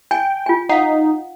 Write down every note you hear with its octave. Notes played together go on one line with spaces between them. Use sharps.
G5 G#5
F4 G#5
D#4 F5 F#5